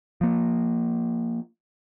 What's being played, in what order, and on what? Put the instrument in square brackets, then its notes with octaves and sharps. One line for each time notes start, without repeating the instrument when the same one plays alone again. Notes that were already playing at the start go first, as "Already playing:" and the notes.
[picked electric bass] F3 A#3